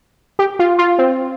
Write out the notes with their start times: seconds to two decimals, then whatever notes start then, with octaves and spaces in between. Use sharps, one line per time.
0.39 G4
0.59 F4
0.79 F4
0.98 C4